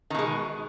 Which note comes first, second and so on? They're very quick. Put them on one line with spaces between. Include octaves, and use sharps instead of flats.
D#3 B2 G#3